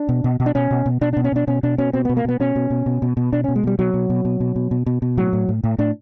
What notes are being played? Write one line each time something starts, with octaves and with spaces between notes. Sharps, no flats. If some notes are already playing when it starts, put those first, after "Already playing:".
Already playing: D4
B2
B2
B2
D4
B2 C#4
B2
B2
B2 D4
D4
B2
C#4
B2 D4
B2 C#4
B2 D4
B2 C#4
B2 C4
B3
B2
A#3
B2 B3
B2 C#4
B2
B2
B2
B2
B2
B2 D4
C#4
B2
G#3
B2 G3
B2 F#3
B2
B2
B2
B2
B2
B2
B2
B2
A2 F#3
A2
A2
A2
A2 D4